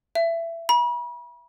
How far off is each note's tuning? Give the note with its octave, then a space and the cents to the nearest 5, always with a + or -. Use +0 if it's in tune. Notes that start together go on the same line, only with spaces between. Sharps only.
E5 +20
B5 -40